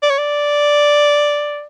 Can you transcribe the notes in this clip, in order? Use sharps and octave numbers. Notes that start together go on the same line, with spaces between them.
D5
C#5
D5